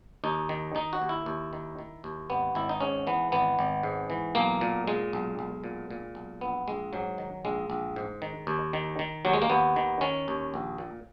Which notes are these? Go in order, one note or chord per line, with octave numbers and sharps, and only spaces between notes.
D#2 D#4
D#3
D#3 D#4
F#4
D#2
E4
D#2
D#3
D#3
D#2
G#1 B3
G#1 E4
D#4
G#2 C#4
E3 B3
G#1 B3
G#1
G#2
E3
B1 A#3
A#2
A#2 G#3
B1
B1
A#2
A#2
B1
A#1 B3
A#1 G#3
G#2 F#3
D#3
A#1 G#3
A#1
G#2
D#3
D#2
D#3
D#3
D#2 F#3
G#3
A#3
D#2 B3
D#3
D#3 C#4
D#2
A#1
A#2